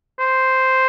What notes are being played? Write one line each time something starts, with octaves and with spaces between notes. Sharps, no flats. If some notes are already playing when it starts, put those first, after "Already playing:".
C5